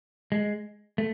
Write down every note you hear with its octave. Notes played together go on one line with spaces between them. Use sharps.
G#3
A3